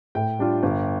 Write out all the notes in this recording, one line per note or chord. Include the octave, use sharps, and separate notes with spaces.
A2 G5
G3 D4 F4
G1